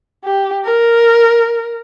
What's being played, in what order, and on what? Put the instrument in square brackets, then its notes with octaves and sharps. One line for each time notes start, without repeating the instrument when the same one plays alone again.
[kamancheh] G4
A#4